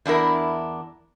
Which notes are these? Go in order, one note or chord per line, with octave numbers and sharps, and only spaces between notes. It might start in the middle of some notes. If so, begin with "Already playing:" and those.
E2 D4 E4 A#4